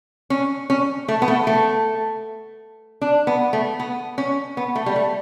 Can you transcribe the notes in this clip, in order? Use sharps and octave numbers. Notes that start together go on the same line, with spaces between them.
C#4
C#4
A3
B3
A3
A3
D4
B3
A3
B3
C#4
B3
A3
G3
A3